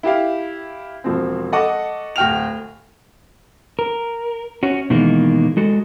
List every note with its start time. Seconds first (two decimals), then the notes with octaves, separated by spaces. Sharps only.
0.03 E4 G4 F5
1.04 E1 F3 C4
1.52 A4 D#5 F#5 C#6 D6
2.16 D1 F#4 G5 F6 F7
3.79 A#4
4.63 C#4 F#4
4.90 B2 D#3 E3 G#3 A#3
5.57 G#3 F#4 A4